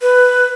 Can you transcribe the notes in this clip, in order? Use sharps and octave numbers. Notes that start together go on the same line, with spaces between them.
B4